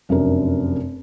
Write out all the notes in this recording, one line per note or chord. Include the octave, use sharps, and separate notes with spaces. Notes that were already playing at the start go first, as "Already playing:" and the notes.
F1 F#2 D4 A#4